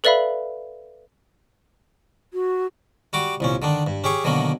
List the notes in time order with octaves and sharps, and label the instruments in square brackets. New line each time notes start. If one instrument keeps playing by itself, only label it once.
[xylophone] A4 B4 D5 E5 F5 B5
[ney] F#4
[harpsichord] G3 F#4 D6
C2 A#2 C#4
D3 D#3 D4
G2
C#4 G4 G#4 C#6
B2 D3 D#3 F#3 A#3